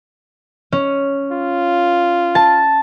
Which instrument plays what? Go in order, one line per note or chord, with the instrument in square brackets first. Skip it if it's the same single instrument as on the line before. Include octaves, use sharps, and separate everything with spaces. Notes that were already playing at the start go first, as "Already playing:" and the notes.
[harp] C#4
[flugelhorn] F4
[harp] A5